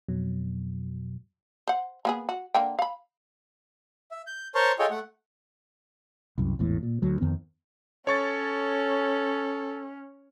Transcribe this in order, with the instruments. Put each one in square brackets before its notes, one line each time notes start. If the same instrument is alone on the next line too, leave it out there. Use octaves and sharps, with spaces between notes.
[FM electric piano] F2 B2 F#3
[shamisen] C5 F#5
A#3 B3 G#4
F#4
D3 A#3 G5
F5 B5
[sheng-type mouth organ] E5
G6
A#4 C5 C#5 A5 C6 C#6
F4 G#4 A4 C#5 D#5 G5
A3 F#5
[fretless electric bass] C2 F#2
G#1 E2 A2
A#2
D2 F#3
F2 D#3 B3
[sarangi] C#4 [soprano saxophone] A4 [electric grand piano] C#5 C#6 A6